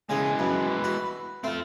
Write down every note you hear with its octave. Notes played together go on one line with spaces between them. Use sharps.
C#3 E3 G#3 G#5 D#6
F#2 B4
F#4
A3 C4 F4